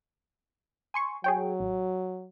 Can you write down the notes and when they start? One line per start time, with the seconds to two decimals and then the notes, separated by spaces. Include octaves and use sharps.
0.94 G#5 C6 C#6
1.24 F#3 G#4 C#5 G5
1.60 A1